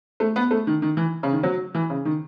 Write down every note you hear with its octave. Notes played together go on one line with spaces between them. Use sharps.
A3
B3
A3
D#3
D#3
E3
C#3
D#3
F#3
E3
C#3
D#3